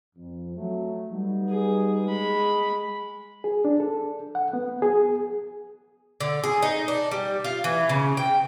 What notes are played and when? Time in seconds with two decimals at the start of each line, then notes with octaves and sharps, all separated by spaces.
0.15 F2
0.56 F#3 A3
1.12 G3 B3 D#4
1.49 G#4
2.07 G#3 B5
3.44 G#4
3.65 D4
3.80 A4
4.35 F#5
4.53 B3
4.82 G#4
6.20 D3
6.44 G#4
6.62 D#4
6.88 D4
7.11 G3
7.44 F4
7.64 E3
7.89 C#3
8.17 G5